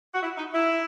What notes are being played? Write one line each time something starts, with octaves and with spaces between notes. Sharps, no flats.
F#4
E4
D#4
E4